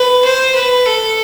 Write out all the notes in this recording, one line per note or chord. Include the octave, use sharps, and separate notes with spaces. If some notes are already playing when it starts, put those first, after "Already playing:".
Already playing: B4
C5
B4
A4